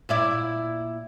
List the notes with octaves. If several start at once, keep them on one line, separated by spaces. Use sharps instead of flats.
A#2 E4 D5